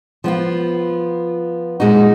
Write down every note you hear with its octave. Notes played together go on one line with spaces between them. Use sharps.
F3 B3 F4
A#2 G#3 D#4 F#4